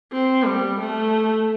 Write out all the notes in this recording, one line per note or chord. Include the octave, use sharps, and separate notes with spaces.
C4
G3
A3